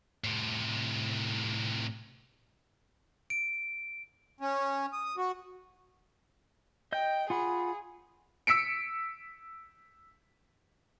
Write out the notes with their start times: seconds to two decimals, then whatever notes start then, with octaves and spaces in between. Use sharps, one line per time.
0.24 A2 C3
3.30 D7
4.40 C#4
4.93 D#6
5.17 F#4
6.92 D#5 G5 G6
7.30 F4 G#4 F#5 B5
8.47 E6 B6 C#7 D7